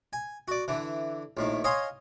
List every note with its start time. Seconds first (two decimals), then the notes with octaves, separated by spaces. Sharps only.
0.13 G#5
0.48 F#4 D5
0.68 D3 E3
1.37 A#1 A2 D#3
1.64 C#5 D#5 F5 G#5 C6 D#6